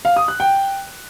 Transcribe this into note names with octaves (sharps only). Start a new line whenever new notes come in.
F5
D#6
F#6
G5